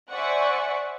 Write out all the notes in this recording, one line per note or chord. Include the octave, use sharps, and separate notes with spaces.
C5 D5 E5 F#5 G#5 C#6